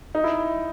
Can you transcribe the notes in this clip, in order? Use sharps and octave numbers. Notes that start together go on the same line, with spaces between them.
D#4
E4